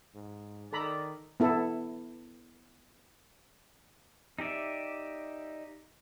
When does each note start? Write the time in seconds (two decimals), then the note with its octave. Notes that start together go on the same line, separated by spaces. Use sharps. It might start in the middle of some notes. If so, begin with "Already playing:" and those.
0.15 G#2
0.73 D#3 A4 D5 A#5 B5
1.40 B3 E4 A4
4.39 D#4 G4 D5 E5